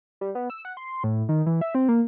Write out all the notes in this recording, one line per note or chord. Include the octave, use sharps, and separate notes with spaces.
G3
B3
E6
F#5
C6
A2
D#3
E3
E5
C4
A#3